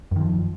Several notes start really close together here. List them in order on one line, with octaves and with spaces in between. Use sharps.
F#2 D#3 F3